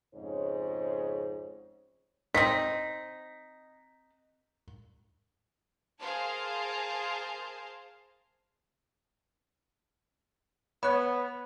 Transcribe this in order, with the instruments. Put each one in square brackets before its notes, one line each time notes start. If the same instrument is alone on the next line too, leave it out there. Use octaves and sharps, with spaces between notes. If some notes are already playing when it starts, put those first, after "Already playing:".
[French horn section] F2 G#2 C#3 C5 C#5
[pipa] C4 D#4 [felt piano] B6
[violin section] G#4 A#4 C5 F5 A5
[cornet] B3 [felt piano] C#5 [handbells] B5 F#6